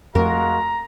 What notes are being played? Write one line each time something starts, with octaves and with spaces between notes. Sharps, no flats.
F2 G#3 A3 F#4 A#4 F5 A#5